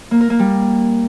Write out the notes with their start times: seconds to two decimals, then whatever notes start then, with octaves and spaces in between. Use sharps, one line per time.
0.11 A#3
0.21 A#4
0.30 A#3
0.39 G3